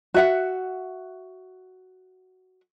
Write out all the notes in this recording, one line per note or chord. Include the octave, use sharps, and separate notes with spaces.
F#4 E5 F#5